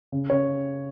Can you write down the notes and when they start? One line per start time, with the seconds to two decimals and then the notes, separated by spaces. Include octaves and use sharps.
0.12 C#3
0.30 C#3 C#5